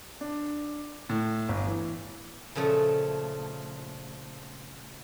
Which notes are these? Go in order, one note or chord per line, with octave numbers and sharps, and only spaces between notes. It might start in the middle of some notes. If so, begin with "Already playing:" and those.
D4
A2
G1
E3
A#2 C#3 F3 A3